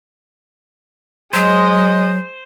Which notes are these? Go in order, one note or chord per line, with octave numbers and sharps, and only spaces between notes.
F#3 G#3 C5 D#5